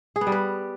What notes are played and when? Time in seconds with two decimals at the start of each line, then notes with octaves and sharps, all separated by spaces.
0.16 G#4
0.21 B3
0.27 G3
0.32 B4